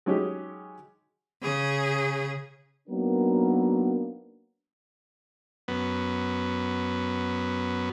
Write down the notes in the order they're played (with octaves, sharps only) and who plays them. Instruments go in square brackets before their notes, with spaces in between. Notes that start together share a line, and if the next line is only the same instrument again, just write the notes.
[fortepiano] F#3 G#3 C#4 D#4 G4 G#4
[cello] C#3 G#4
[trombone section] F#3 A#3 B3 D4 D#4 A#4
[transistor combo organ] F#2 B3